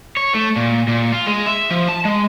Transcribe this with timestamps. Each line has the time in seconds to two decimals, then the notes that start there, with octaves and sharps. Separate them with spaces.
0.17 C#5
0.34 A3
0.56 A#2
0.88 A#2
1.12 F4
1.27 G#3
1.46 E5
1.70 F3
1.89 A5
2.05 G#3